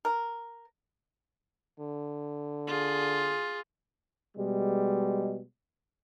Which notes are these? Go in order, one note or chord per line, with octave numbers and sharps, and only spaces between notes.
A#4
D3
F4 G#4
B2 G3 G#3